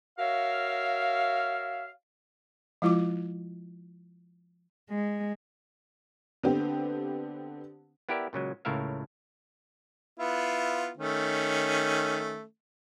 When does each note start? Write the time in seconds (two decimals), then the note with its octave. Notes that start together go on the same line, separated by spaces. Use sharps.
0.18 F#4 A#4 C#5 E5 F5
2.82 F3 G#3 E4 F4 D6
4.90 G#3
6.43 D3 B3 C4 G4
8.09 B3 E4 G4 A#4 D5 E5
8.33 A#2 C#3 F#3 G#3
8.65 C#2 A2 C#3 A#4 E5 F5
10.19 B3 E4 F4
10.97 D#3 A3 C#4